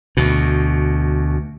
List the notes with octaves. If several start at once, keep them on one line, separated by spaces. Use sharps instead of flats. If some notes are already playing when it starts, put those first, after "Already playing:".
D2 B2